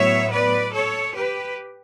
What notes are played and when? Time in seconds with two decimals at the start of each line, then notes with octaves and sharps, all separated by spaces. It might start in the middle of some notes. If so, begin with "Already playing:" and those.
Already playing: A2 F#3 B3 C#5 E5
0.31 B4 D5
0.73 A4 C#5
1.14 G4 B4